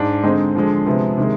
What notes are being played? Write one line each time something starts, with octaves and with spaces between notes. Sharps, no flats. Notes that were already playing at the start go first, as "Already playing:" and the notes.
Already playing: G#2 D4
D3 G#3 C4 D#4
D3 F3 G#3
C3 F3 G#3 B3
C3 D#3 G#3